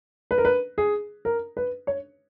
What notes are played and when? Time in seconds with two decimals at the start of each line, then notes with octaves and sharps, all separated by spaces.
0.31 B4
0.38 A#4
0.45 B4
0.78 G#4
1.25 A#4
1.57 B4
1.87 C#5